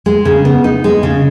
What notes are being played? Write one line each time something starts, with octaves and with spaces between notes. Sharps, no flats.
G#3
C#3
B3
D#4
G#3
C#3